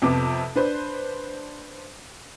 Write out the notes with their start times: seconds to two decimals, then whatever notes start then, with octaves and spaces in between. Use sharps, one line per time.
0.02 F2 C3 B3 D6
0.55 D4 B4 C5